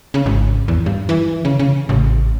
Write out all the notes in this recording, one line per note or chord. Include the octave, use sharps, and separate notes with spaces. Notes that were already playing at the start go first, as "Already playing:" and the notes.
C#3
G#1
E2
G2
E3
C#3
C#3
A1